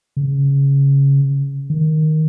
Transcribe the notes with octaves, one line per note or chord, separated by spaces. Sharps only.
C#3
D#3